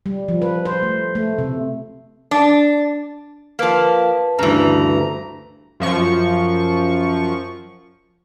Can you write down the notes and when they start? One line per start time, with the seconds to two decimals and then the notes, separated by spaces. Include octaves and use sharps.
0.06 G3
0.28 F3
0.42 B4
0.65 C5
0.82 A3
1.15 A3
1.38 C3
2.31 D4
3.59 F3 A#3 B4 A5
4.39 D2 G2 C#3 E3 A#5
5.80 F#2 F3 C#6